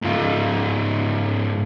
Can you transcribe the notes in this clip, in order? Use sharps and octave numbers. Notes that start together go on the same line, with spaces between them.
G#2 F4